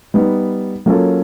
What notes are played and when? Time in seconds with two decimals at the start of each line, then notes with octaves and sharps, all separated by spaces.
0.14 G3 B3 D#4
0.86 F#3 A#3 C#4 F4 A4